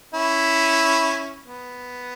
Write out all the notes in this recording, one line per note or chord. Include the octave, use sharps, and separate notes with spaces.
C#4 E4
B3